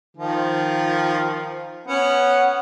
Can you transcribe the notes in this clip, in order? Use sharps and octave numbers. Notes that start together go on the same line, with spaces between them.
D#3 F3
B3 C#4 F#5